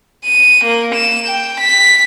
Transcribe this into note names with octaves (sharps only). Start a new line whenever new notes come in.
D#7
A#3
E7
G5
B6